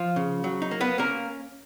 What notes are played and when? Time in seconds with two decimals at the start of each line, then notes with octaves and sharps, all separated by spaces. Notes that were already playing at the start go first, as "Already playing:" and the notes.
Already playing: F3 F4
0.16 C#3
0.44 F#3
0.62 D#4
0.71 A#3
0.81 B3 B4
0.98 A#3 C#4 A#4